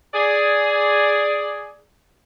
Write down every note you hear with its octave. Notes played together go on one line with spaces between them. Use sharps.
G#4 D5